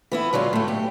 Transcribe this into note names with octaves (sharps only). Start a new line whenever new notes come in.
E3 B3 E4
D3 F#3 G#3 F4
A2 A3
G4